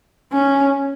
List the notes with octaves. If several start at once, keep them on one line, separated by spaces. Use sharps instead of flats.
C#4